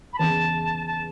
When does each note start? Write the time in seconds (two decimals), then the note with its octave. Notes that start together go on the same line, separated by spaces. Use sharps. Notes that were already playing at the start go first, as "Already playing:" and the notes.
0.13 B5
0.19 E2 C#3 E3 A5
0.87 A5